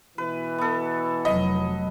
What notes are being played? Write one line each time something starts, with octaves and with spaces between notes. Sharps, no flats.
B2 E3 B4
B3 A4
F1 F#3 D#5 B5